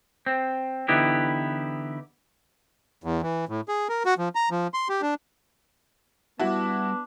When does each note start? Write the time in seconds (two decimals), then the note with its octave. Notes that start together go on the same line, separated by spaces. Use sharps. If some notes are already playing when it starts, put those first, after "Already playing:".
0.26 C4
0.88 D3 E3 B3 D#4 E4 G4
3.04 E2
3.22 E3
3.49 A2
3.68 G#4
3.89 A#4
4.06 F#4
4.18 F3
4.35 A#5
4.51 F3
4.74 C6
4.89 G4
5.02 D4
6.40 G3 B3 D4 E4 F#4 A5